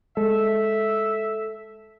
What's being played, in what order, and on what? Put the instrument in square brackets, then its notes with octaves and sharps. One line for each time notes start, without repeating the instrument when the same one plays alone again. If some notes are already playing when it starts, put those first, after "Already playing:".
[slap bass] G#3 [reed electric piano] A4 [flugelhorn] E5